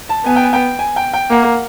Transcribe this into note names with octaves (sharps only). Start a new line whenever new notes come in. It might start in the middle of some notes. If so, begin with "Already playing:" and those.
A5
B3 G#5
G5
G#5
G5
G#5
G5
G5
A#3 F#5